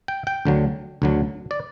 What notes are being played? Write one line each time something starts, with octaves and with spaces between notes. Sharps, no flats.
G5
G5
D2 D3 F#3
D2 D3 F#3
D5